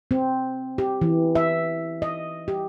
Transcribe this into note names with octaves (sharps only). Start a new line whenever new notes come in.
C4
G4
E3
E5
D#5
G4